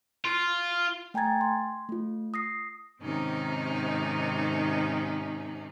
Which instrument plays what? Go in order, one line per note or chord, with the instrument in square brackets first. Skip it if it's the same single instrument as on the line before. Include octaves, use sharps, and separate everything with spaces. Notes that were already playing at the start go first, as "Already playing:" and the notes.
[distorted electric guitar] F4
[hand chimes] A3 G5 G#5 A#5 G#6 A6
C6
A3 F4
D#6 A#6 C7
[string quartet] G#2 C3 D#3 C4 C#4 D#4